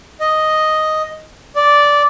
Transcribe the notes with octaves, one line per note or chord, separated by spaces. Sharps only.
D#5
D5